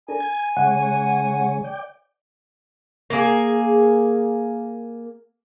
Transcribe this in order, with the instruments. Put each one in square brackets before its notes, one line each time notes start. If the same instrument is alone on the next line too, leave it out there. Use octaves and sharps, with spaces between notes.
[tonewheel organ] D4 A4 A#4 [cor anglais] G#5
[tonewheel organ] G#6
[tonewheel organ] C#3 G#3 C#5 [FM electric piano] F#5
[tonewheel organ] D5 G5
[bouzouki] A#3 G#4